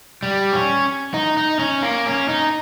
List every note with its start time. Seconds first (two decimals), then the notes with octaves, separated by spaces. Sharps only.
0.23 G3
0.53 C#4
1.14 D#4
1.37 D#4
1.59 C#4
1.83 A#3
2.06 C#4
2.29 D#4